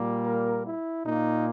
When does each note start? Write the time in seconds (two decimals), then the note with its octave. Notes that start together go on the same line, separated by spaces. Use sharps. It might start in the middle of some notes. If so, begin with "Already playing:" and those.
Already playing: A#2 G3 A#3
0.26 A#4
0.65 E4
1.05 A#2 A#3 D#4